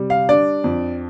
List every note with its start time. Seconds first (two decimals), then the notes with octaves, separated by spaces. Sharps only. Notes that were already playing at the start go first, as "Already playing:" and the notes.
Already playing: C3 G3
0.10 F5
0.29 D4 D5
0.64 F2